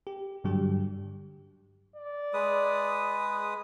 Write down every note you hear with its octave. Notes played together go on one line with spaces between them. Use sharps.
G4
G2 D3 F#3 G3 G4
D5
G#3 B4 D#6